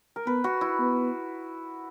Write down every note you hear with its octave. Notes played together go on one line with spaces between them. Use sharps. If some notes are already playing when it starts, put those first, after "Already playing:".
A#4
B3 B4
F#4
E4
B3